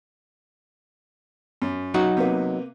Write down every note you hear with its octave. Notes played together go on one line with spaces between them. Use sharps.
F#2
F#3 D#4 F#4
C3 A#3 B3